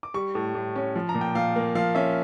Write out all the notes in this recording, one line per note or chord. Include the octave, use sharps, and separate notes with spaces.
D6
G3 C#6
A2
A2
C#4
F3
A#5
A#2
G5
A#2 F5
A#3
F3 F5
C#4 E5